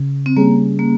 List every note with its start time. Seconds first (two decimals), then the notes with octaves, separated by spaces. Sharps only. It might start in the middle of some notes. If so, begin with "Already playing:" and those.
Already playing: C#3
0.26 C4
0.37 G3 A#3 C#4 G#4
0.79 A#3